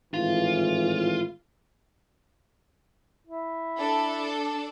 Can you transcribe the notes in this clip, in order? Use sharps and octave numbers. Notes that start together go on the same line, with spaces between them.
G#1 A2 E3 F4
E4
D4 A4